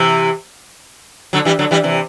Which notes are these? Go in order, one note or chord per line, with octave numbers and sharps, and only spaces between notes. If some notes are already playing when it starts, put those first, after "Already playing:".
Already playing: C3 E3
D3 F#3
E3 G3
D3 F#3
E3 G3
C3 E3